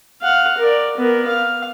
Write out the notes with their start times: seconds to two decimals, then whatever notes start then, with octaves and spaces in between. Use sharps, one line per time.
0.22 F5 F#5
0.58 A#4 D5
0.97 B3 A#4
1.28 F5